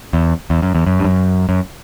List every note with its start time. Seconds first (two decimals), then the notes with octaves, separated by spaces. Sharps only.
0.13 E2
0.50 E2
0.62 F#2
0.75 E2
0.87 F#2
0.99 G2
1.05 F#2
1.49 F#2